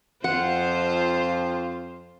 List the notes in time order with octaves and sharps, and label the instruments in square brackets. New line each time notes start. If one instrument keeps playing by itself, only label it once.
[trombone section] F2 [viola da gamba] F4 C5 [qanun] F#5